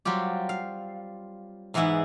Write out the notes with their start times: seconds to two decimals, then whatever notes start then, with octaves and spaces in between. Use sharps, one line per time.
0.05 F#3 G3 C4 F4 G4
0.49 F5
1.74 G#2 E3 G#3 B3 E4